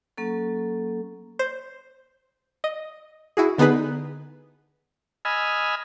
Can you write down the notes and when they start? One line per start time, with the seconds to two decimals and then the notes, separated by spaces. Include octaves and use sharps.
0.18 F#3 A#3 C#4 A4
1.39 C5
2.64 D#5
3.37 E4 F#4 G#4
3.58 D3 B3 D#4 G#4 B4
5.25 D#5 G#5 B5 E6 F6